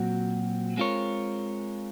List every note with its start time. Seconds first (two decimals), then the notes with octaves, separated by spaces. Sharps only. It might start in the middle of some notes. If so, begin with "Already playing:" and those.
Already playing: A#2 F#3 C4 F#4
0.77 G#3 C4 F4 A#4 C#5